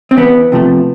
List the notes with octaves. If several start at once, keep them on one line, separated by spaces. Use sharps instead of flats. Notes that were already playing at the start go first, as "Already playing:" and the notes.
C4
E2 B3
C3 F3 A3